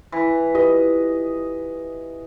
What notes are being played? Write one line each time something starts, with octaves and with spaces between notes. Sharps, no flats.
E3
F4 G4 B4 D#5